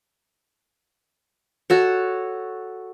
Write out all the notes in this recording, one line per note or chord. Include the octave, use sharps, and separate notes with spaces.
F#4 A4 C#5